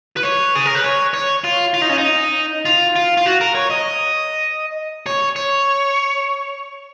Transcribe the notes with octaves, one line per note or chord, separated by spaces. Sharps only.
B4
C#5
G#4
A#4
B4
C#5
C#5
F4
F4
D#4
C#4
D#4
F4
F4
F4
F#4
A#4
C#5
D#5
C#5
C#5